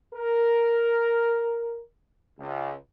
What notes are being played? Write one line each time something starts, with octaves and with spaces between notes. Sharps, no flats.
A#4
C#2